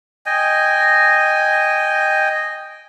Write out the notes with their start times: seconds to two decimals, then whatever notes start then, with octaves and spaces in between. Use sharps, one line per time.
0.26 D#5 G5 G#5